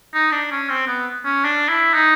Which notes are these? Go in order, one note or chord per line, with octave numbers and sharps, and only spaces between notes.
D#4
D4
C#4
C4
B3
C#4
D4
E4
D#4